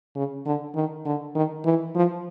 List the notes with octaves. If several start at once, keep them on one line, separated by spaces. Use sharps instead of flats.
C#3
D3
D#3
D3
D#3
E3
F3